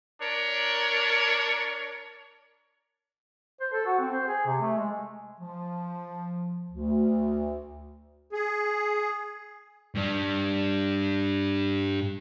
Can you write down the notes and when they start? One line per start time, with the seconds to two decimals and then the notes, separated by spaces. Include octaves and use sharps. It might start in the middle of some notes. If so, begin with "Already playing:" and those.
0.21 D4 A#4 C#5
3.60 C5
3.73 A4
3.86 F#4
3.99 C4
4.13 C5
4.28 G#4
4.46 C3
4.61 A3
4.77 G#3
5.39 F3
6.71 D2
8.32 G#4
9.95 G2 G3